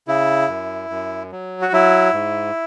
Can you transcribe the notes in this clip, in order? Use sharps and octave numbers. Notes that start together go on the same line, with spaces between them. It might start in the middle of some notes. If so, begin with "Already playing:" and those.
C#3 E4
F#2
F#2
F#3
F#4
F#3 E4
G#2